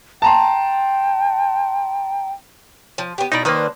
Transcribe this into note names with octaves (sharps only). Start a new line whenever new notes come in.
G5 A5 A#5 C6
F3
B3 G4
B2 D#4 E4 D5 A#5
D#3 A#3 D4 B4 C5